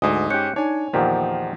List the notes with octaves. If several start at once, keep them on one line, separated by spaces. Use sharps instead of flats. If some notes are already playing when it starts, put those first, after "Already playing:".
D2 G#2 D#5 G#5 D#6
C#4 G4 F#6 G6 C#7
D4 D#4 C#5 G#5
E2 A#2 D#3 F3 G4 C5 F#5